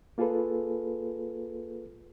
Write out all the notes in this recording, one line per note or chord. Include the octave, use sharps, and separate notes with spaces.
A#3 F4 G#4 A4 B4